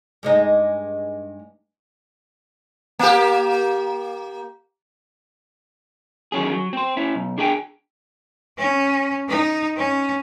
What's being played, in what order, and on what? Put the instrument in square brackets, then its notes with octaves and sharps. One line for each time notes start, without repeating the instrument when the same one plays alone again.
[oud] G2 G#3 D#4
[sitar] A#3 G4
[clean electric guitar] D#3 F#3 C#4 G#4
F#3
C4 C5
C#4 E4
B1
D4 G#4 A#4 D5 G5 G#5
[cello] C#4
D#4
C#4